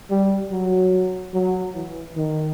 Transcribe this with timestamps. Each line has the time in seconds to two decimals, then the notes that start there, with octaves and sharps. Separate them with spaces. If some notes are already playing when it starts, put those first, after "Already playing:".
0.10 G3
0.51 F#3
1.34 F#3
1.74 E3
2.15 D#3